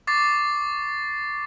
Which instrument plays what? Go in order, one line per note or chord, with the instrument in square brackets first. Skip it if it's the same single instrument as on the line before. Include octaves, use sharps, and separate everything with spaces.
[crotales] C#6 D6 A6 C7